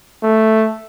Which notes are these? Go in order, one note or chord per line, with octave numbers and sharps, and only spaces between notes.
A3